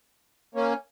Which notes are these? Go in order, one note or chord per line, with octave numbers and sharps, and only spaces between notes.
A#3 C#4